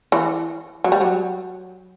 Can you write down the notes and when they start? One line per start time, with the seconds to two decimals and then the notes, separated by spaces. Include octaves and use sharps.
0.12 E3
0.84 F#3
0.92 G3
1.01 F#3